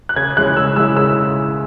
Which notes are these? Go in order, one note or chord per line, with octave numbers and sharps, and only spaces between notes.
F#6
C#3 G#6
G#3 C#4 E4 F#6
C#3 E6
G#3 C#4 E4 E6
C#3 E6